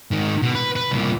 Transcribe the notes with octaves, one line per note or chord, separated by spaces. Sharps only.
G#2 D#3
B2
B4
B4
C2 A#2